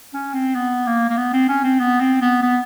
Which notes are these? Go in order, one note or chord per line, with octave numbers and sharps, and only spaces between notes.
C#4
C4
B3
A#3
A#3
B3
C4
C#4
C4
B3
C4
B3
B3